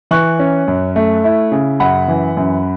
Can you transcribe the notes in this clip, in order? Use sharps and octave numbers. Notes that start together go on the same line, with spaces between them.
E3 C#6 F#6
C#4
F#2
A3
E4
C#3
F#2 F#5 B5
E3
F#2